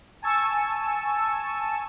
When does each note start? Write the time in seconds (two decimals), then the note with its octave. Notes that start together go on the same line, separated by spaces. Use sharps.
0.22 G#5 A5 C#6 E6